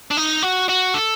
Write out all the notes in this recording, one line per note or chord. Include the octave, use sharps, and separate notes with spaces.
D4
D#4
F#4
F#4
A4